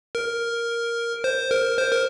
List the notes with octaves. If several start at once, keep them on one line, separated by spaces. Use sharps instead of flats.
A#4
C5
A#4
C5
A#4